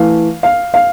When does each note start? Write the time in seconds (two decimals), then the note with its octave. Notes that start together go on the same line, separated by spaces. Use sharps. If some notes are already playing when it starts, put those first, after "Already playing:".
Already playing: E3 A3 F5
0.43 F5
0.74 F5